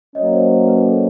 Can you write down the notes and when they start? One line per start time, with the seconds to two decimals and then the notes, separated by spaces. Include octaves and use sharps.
0.15 F#3 A#3 C#4 C#5 D#5
0.33 C5 D5
0.51 C5
0.68 B4
0.86 A4